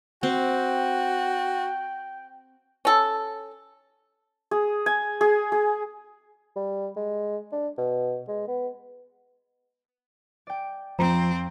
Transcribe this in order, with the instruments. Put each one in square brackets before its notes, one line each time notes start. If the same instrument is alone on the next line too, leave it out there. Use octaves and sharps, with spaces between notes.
[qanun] C4 [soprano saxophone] F#4 [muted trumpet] G5
[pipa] C#4 A4
[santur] G#4
G#5
G#4
G#4
[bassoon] G3
G#3
D4
B2
G#3
B3
[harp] D5 G5
[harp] F2 [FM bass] F3 [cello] C4 [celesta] A#5